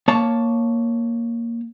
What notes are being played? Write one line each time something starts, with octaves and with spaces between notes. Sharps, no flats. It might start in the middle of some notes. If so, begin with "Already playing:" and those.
A#3 C#5 A5